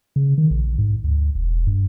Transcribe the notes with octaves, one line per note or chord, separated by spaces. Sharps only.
C#3
D#3
A#1
G#2
D2
E1
G2